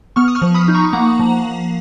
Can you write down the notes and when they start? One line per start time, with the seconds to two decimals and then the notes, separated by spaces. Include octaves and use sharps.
0.16 B3 C#6 F6
0.28 D#6
0.35 C#6 F6
0.42 F3
0.54 B5 D#6
0.68 D#4
0.75 A#5 C#6
0.93 A#3 F#5 A#5
1.19 F3